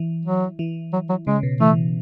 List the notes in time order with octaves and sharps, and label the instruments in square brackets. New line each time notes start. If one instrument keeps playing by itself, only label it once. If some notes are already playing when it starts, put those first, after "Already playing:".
Already playing: [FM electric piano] E3
[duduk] F#3
[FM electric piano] E3
[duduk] F#3
F#3
[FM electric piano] C#3 [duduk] G#3
[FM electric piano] B2
[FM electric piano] E3 [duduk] A3